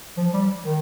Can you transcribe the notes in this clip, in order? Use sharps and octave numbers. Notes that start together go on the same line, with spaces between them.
F3
G3
D#3